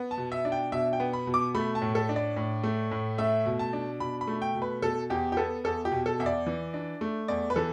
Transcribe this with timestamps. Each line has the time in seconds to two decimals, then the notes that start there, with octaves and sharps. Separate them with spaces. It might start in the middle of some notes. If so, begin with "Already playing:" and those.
Already playing: B3
0.11 A5
0.18 B2
0.32 E5
0.45 D4
0.52 G5
0.72 B2 E5
0.93 G5
1.00 B3
1.13 B5
1.27 B2
1.34 D6
1.55 A3 B5
1.75 A5
1.82 A2
1.95 A4
2.09 D4
2.16 D5
2.36 A2
2.64 A3
2.91 A2
3.18 A3 E5
3.46 B2
3.59 A5
3.73 D4
4.00 B2 B5
4.21 B5
4.28 A3
4.42 G5
4.55 B2
4.62 B4
4.82 B2 A4
5.10 E2 G4
5.32 G4
5.37 B3 A4
5.64 E2 A4
5.85 G4
5.92 B2
6.06 A4
6.19 E2 E5
6.26 D5
6.46 E3
6.74 D4
7.01 A3
7.28 E2 D5
7.50 B4
7.56 E3 A4